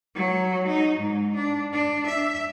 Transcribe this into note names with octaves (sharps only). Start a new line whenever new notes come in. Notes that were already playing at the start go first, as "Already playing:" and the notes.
F#3
D#4
G#2
D4
D4
E5